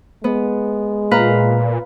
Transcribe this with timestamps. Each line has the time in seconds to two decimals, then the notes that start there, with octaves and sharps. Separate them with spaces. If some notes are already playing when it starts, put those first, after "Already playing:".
0.24 G#3 B3
1.11 A#2 B4 F5 A#5